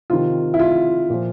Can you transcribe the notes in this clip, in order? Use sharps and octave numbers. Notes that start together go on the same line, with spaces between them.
C3 D#3 F4
E4
F4
A#2 F3